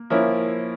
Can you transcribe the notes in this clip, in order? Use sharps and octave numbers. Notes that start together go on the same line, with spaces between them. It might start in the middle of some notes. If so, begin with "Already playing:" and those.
Already playing: A#3
F3 A#3 C#4 E4